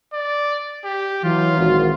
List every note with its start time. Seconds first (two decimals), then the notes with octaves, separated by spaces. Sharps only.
0.14 D5
0.84 G4
1.24 E3 F#3 F4
1.57 G#1 A#2 F#4